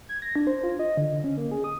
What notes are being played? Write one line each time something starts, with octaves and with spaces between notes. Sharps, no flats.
G#6
A#6
D4
C5
F4
D#5
D3
D3
C#4
A#3
G#4
D#6